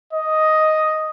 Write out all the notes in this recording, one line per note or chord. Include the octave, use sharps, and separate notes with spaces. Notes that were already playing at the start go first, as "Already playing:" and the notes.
D#5